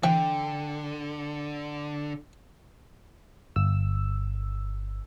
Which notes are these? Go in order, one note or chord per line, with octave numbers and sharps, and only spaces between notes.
D3 E3 G5
G1 E6